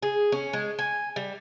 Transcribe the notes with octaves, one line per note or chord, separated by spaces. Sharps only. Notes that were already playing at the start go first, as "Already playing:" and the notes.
G#4
C#4
G#3
G#5
G3